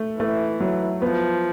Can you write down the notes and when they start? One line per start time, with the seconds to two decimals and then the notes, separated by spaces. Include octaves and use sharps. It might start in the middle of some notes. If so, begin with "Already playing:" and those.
Already playing: A3
0.19 E3 A3
0.60 F#3
1.02 F3 B3